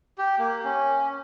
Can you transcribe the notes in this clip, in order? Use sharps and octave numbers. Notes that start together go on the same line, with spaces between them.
G4
A#3
C#4